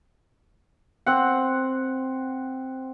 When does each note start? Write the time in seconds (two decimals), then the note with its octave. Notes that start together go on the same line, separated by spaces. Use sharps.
1.06 C4 F#5